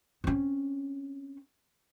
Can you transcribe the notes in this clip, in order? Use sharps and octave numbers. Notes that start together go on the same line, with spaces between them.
C4 C#4